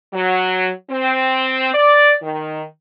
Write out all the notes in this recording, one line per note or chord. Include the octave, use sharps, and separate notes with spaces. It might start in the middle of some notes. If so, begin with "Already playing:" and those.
F#3
C4
D5
D#3